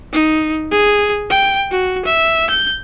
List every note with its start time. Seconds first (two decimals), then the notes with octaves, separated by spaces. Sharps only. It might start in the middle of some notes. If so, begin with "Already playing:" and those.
0.13 D#4
0.71 G#4
1.30 G5
1.71 F#4
2.05 E5
2.50 G6